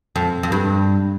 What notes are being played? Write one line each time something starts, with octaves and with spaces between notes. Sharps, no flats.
F2
F2
G2